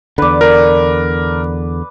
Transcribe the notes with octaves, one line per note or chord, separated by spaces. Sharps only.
E2 D3 B4 D5
A#4